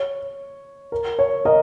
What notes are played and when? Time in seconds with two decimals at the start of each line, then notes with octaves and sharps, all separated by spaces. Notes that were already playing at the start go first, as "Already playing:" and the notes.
Already playing: C#5
0.92 A#4
1.19 C#5
1.45 A#4 D#5